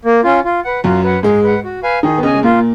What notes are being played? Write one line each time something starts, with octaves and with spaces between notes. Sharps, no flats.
A#3
C#4 F4
F4
B4 F#5
F#2 F#3 F4
B4 F#5
G#2 G#3 G#4
B4 F#5
F#4
B4 F5 G#5
D#3 D#4 G#4
B3
C#3 C#4 D#5 G#5
G#3
A#2 A#3 F4